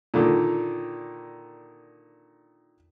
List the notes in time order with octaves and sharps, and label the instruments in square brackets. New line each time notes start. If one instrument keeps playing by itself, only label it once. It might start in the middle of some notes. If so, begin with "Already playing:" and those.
[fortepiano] A#2 D3 D#3